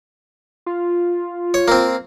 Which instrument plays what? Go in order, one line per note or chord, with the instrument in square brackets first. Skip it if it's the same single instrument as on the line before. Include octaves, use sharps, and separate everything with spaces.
[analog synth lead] F4
[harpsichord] C#5
A#3 C4